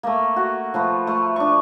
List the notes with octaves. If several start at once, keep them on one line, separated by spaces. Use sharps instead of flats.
A3 A#3
F#4
F3 A3 B4
A3
D4 C#6